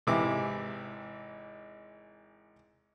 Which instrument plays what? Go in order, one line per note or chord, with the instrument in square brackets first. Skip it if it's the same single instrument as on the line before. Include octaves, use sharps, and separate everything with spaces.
[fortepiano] G#1 C3 E3 D6